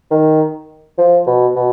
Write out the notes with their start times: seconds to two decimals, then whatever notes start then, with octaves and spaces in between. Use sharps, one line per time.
0.11 D#3
0.98 F3
1.27 B2
1.56 B2